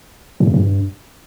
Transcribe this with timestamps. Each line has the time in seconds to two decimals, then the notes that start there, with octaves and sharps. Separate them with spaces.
0.40 G#2
0.47 F2
0.54 G2